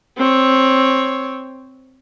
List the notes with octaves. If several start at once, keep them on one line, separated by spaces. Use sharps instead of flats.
C4 C#5